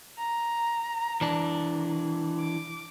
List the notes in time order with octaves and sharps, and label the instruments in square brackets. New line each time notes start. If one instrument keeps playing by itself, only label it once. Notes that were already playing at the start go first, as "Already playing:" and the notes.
[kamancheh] A#5
[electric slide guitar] E3 D4
[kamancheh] D6